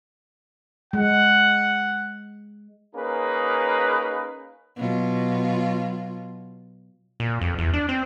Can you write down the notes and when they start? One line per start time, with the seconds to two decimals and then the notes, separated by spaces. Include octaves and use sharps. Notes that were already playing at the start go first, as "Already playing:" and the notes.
0.93 G#3 F#5
2.95 A#3 C#4 D#4 G#4 B4
4.77 B2 F#3 F4
7.20 A#2
7.41 F2
7.59 E2
7.73 D4
7.89 C4